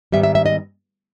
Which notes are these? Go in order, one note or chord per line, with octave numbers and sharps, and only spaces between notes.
G#2 D#3 G3 B3 E5
E5
E5
D#5